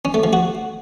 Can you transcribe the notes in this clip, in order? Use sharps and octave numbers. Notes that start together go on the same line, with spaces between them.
C#4
A3
F3
F#4